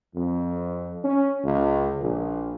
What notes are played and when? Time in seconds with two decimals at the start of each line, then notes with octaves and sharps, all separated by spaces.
0.13 F2
1.02 C#4
1.43 C#2
1.99 A#1